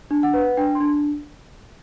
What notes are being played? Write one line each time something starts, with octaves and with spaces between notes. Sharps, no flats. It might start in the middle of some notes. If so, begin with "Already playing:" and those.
D4
F#5
B4
D4 G5
C6
D4